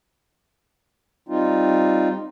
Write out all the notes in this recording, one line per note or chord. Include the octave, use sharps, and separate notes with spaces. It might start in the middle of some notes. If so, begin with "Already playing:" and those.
G3 C4 D#4 F4